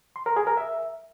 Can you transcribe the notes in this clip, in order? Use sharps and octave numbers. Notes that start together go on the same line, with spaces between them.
C6
A#4
G#4
A#4
E5